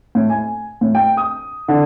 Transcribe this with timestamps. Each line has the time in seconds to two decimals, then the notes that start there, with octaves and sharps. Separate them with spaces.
0.15 A2
0.30 G#5
0.81 A2
0.95 G5
1.17 D#6
1.68 D3